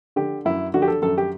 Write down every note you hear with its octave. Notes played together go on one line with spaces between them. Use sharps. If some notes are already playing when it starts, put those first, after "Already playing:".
D3 G4
F#2 E4
D3 F#4
G4
A4
F#2 A4
G4